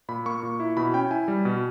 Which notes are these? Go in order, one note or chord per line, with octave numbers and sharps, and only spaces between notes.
A#2 B5
A#3 C#6
A#2
E4
B2 B5
C#4 G5
E4 G#5
G3
B2